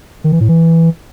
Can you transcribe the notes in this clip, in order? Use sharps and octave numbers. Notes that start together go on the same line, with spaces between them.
D#3
E3
A2
E3